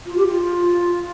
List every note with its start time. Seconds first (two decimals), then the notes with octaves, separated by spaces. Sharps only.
0.06 F4
0.17 G4
0.27 F4